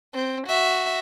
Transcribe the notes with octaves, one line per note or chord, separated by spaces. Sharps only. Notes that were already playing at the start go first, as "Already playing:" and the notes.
C4
F#4 E5